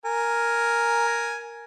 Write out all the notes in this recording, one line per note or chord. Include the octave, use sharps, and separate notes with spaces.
A#4 G#5